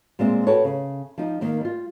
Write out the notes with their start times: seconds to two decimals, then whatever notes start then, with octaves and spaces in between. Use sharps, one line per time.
0.19 A#2 G#3 C4 E5
0.47 F#4 G4 A4 B4 C#5
0.64 C#3
1.18 F3 D#4
1.41 D#3 A#3 D#4
1.61 G3 F4